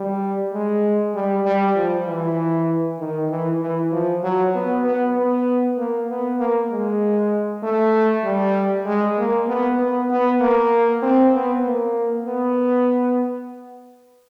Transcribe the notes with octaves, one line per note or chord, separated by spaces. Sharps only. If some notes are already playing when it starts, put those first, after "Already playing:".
Already playing: G3
G#3
G3
G3
F3
E3
D#3
E3
E3
F3
F#3
B3
B3
B3
A#3
B3
A#3
G#3
A3
G3
G#3
A#3
B3
B3
B3
A#3
C4
B3
A#3
B3